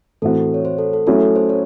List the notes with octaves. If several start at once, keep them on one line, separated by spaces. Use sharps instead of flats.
A2 E3 C4 F#4 A4
C#5
C5
A4
A4
F#3 A3 C#4 E4 A4
A4
C5
C#5